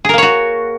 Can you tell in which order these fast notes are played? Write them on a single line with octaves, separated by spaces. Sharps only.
G#4 A#4 A#3 C#5 F#4